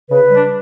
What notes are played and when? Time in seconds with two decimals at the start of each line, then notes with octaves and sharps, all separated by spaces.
0.10 C#3 B4
0.31 G3 D4